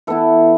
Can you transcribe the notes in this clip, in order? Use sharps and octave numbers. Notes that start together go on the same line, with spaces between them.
E3 B3 E4 A4